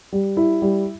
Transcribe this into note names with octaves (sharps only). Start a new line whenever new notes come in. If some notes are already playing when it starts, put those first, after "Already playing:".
G3
E4
G3